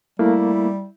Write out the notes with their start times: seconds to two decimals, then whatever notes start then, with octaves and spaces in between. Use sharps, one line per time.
0.19 G3 A3 A#3 E4